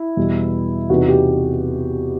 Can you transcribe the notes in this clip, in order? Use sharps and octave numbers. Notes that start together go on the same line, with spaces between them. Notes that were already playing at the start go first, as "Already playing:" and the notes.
Already playing: E4
E2 B2 G3
E2 C3 E3 B3 D#4 F#4
G4